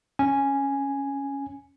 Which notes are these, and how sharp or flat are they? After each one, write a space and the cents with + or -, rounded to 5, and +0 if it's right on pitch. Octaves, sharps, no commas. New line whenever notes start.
C#4 +0 G#5 +0